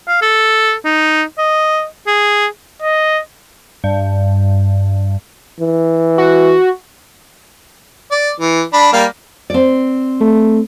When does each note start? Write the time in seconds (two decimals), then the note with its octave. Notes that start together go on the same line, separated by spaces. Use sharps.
0.08 F5
0.22 A4
0.85 D#4
1.38 D#5
2.07 G#4
2.82 D#5
3.84 G2
5.60 E3
6.18 F#4
8.11 D5
8.40 E3
8.73 D4 B5
8.93 G3 A#3 F5
9.50 C4 D5
10.20 A3